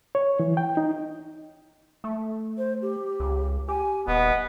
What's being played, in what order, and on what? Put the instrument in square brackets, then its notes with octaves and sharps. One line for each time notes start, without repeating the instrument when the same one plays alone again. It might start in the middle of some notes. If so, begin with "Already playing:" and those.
[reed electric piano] C#5
E3
G5
D#4
[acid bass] A3
[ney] C5
G4
[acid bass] C#2
[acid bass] G4 [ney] G#5
[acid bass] D#1 [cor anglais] B3 [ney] D#5